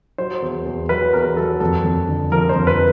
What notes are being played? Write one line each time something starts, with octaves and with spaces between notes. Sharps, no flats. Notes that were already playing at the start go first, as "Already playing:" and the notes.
F#3 C5
E2
E2
F#3 B4
E2 A#4
F#3 A4
F2 A4
F2
D3
F3 A#4
C5
F2
B4